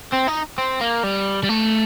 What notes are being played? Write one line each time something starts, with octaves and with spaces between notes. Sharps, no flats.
C4
D#4
C4
A#3
G3
G3
A3